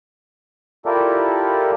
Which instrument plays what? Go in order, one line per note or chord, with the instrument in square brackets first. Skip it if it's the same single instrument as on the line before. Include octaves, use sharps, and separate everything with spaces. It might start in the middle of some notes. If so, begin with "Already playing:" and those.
[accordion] E4 F4 G4 A4 A#4 D5